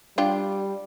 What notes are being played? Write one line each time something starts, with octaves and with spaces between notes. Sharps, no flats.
G3 D4 F4 G4